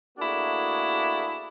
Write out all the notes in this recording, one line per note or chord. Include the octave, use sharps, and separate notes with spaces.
A3 A#3 D4 E4 F#4 G#4